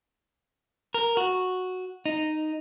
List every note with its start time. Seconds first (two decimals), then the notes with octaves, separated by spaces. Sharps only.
0.94 A#4
1.17 F#4
2.06 D#4